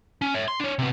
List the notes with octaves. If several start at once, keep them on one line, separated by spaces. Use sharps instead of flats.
C#4
C#5 E5
C6
D4 C#5
C3 B3